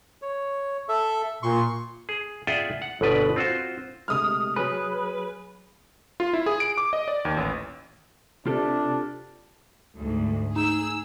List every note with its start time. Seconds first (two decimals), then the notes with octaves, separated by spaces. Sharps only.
0.22 C#5
0.89 A4 E5
1.43 A#2 C6 C#6
2.09 G#4
2.47 F4 G#4 D5 E5 F#5 G5
2.82 F#5
3.01 G1 B2 B4 D5
3.36 C4 F4 F#4 C5
4.08 C3 G#3 A3 D#6 F6
4.56 F#3 G#4 B4
6.20 F4
6.33 E4
6.46 G#4
6.60 D7
6.78 D6
6.93 D#5
7.08 D5
7.25 D#2
7.37 A1
8.46 C3 D4 F4 G4 A4
9.96 D2 G#2
10.56 D#4 G#4 E6